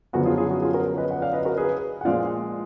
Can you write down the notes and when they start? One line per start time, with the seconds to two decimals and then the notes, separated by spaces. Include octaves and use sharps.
0.13 F#2 D3 F3 B3 F#4
0.25 F4 G#4
0.37 F4 G#4
0.50 F#4
0.62 F4 G#4
0.74 F#4 A#4
0.97 B4 D#5
1.11 F#5
1.21 D5 F5
1.33 B4 D#5
1.45 F#4 A#4
1.57 G#4 B4
2.01 F#5
2.05 A#2 F3 G#3 D5 F5